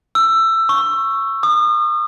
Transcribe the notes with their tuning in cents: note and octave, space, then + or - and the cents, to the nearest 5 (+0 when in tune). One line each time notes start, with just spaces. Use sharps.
E6 +15
C#6 -5
D#6 -40